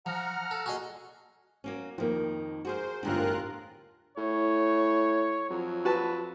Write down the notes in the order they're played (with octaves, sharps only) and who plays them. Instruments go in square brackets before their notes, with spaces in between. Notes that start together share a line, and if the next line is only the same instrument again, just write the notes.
[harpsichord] F3 [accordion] F#5 A#5 F6
[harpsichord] A4
[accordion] A#2 [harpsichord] F#4 G#4 D#5
[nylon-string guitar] F#3 A#3 C#4
[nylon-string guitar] F2 D#3 [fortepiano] F3 A#3
[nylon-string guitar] F#4 G#4 A#4 [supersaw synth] C5
[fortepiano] A1 D3 [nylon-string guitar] E2 G2 [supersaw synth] F4 A#4 F#6
[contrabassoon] A2 [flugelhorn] C#5
[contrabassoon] F2 [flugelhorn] F#3
[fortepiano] F#4 B4 A5